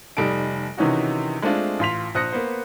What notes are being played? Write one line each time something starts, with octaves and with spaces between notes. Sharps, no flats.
F1 G3 D#4 A4 A5 D7
C3 D#3 E3 C#4 D#4 F#4
G#3 A3 C4 D4 F4
A1 F4 C6 B6 F7
A#1 C5 D#6 F#6 A#6 C#7
A#3 B3 C5